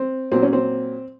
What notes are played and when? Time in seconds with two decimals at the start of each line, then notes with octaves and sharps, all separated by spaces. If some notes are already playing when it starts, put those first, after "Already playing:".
Already playing: C4
0.32 A#2 F#3 C4
0.43 C#4
0.53 C4